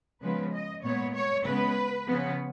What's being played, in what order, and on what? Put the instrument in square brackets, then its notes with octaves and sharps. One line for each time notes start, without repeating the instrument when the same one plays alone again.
[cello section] C#3 F3 G#3 B3 B4
D#5
A#2 G#3 B3 C#5
C#5
C#3 G#3 B3 B4
C#3 F3 B3